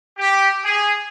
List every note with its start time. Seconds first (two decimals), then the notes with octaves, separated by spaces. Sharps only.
0.18 G4
0.65 G#4